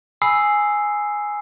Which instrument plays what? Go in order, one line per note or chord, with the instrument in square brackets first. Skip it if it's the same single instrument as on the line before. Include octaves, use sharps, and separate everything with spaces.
[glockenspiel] G#5 B5 D#6 E6 C7